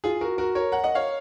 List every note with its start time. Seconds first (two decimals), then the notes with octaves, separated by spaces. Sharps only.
0.04 F4 G#4
0.21 F#4 A#4
0.38 F#4 A#4
0.55 A#4 C#5
0.72 F#5 A#5
0.83 D#5 F#5
0.95 C#5 F5